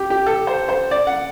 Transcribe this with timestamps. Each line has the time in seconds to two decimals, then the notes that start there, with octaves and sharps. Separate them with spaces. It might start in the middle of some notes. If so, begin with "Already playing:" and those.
Already playing: G4
0.10 G4
0.26 A4
0.47 C5
0.69 C5
0.91 D5
1.07 F#5